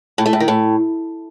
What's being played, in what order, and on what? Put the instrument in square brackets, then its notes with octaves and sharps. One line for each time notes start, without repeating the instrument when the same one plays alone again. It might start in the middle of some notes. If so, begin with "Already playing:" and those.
[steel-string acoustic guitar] A2
A3
A2
D#3
A2